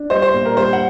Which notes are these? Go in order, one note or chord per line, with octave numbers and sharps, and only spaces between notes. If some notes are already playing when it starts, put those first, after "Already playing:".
Already playing: D4
G3 C5 D#5
C5
A#2
A#4
G3 C5
F#5